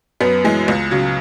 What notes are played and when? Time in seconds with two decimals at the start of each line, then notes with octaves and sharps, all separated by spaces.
0.20 F#2 B3
0.44 E3 G#3
0.68 C#2
0.91 C#3 F#3